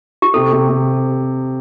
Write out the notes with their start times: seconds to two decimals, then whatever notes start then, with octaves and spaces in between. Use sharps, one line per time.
0.22 G4
0.34 C3 A4
0.52 C3
0.69 C3